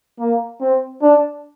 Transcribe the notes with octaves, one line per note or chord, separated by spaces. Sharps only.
A#3
C4
D4